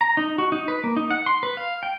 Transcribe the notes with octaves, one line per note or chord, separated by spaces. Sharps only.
A#5
D#4
F#4
D#4
B4
A#3
D#4
F#5
C6
B4
F5
G5